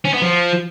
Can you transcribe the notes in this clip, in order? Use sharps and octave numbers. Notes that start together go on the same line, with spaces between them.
C#4
B3
F3